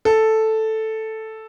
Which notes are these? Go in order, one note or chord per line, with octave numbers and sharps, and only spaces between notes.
A4